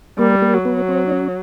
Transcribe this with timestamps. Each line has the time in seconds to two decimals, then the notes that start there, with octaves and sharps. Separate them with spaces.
0.19 G3 A#3
0.42 A#3
0.53 F#3
0.65 B3
0.88 C4
1.07 D4
1.12 C#4